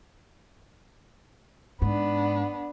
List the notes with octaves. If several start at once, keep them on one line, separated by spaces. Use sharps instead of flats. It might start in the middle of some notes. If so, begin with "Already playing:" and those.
G#2 B3 D4